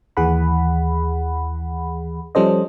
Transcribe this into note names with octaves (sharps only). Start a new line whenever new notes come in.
D#2 E3 G#4 F#5 B5
F3 G3 C#4 A4 C5 D#5